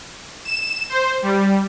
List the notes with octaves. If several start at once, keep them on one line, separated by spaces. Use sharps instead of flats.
E7
C5
G3